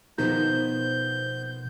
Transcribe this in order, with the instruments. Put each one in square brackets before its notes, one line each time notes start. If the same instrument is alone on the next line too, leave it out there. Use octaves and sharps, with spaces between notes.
[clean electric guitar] B2 F3 A#5 [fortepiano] D#3 [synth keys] B3 C5 [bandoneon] G6